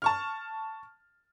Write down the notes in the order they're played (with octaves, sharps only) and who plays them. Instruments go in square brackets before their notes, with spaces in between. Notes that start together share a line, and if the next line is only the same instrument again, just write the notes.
[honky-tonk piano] A5 C#6 F6